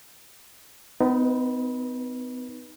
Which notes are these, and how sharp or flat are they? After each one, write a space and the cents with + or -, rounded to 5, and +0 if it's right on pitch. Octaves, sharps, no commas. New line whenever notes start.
B3 +40 D#4 +0 B4 -25